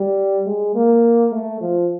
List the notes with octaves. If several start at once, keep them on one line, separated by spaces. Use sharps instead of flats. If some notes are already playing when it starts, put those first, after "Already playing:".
Already playing: G3
G#3
A#3
A3
F3